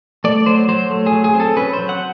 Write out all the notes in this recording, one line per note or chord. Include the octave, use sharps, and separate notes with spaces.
A3 D5
F#3 C5
F#3 C5
A3
G#4
F#3
G#4
C4
A4
C#4 B4
C5
F#3
F#5